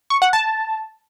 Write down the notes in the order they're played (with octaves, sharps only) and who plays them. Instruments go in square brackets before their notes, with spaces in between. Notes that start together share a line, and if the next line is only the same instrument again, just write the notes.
[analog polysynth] C#6
F#5
A5